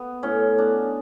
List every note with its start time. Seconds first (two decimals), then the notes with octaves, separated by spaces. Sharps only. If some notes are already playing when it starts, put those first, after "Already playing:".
Already playing: B3
0.23 A2 C#4
0.58 B3 D4